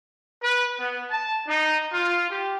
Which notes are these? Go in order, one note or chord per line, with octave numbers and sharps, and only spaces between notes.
B4
B3
A5
D#4
F4
G4